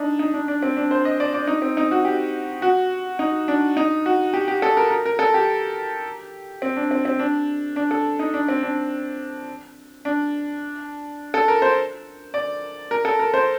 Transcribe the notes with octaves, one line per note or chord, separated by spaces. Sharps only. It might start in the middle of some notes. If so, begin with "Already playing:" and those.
Already playing: D4 D#4
D#4
D4
D4
C4
D4
C5
D#5
D5
D5
D#4
C4
D#4
F#4
G4
F#4
D#4
D4
D#4
F#4
G4
G4
A4
A#4
A#4
A#4
A4
G4
C4
D4
C4
C4
D4
D4
A4
D#4
D4
C4
D4
D4
A4
A#4
C5
D5
A#4
A4
A#4
C5